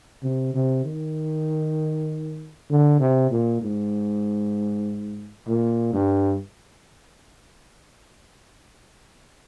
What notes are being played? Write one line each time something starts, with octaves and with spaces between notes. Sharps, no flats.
C3
C3
D#3
D3
C3
A#2
G#2
A#2
G2